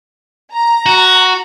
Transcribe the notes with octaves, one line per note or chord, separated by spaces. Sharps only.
A#5
F#4